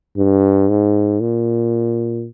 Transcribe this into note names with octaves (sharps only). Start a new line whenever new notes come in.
G2
G#2
A#2